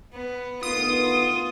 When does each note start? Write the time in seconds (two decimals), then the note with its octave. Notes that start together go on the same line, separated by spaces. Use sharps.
0.14 B3
0.63 D2 D#3 B3 F4 D#6